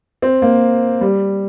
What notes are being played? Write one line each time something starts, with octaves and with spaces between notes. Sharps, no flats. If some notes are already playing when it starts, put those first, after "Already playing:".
C4
A#3
G3